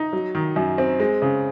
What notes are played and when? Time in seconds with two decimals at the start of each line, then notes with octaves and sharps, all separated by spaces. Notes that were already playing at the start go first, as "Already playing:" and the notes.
Already playing: D#4
0.13 F#3
0.35 D#3
0.56 F#2
0.78 C4
1.00 G#3
1.22 C#3